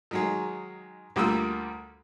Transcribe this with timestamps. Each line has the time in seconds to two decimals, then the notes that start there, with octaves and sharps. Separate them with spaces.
0.11 D#3 F#3 G#3
1.16 D2 G3 A#3 F4 E6